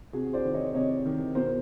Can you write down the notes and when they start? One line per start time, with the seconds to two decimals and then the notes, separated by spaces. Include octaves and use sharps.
0.13 C3 F#4 G#4
0.33 C5 D5
0.44 D#3
0.54 C#5 D#5
0.74 C3 C#5 D#5
1.06 D#3
1.35 B2 A#4 C5